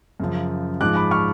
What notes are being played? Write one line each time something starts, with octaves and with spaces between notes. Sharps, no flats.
F#2 C#3 F3
G#2 F3 G#3 D6 F#6
B5 D6
C#6 F6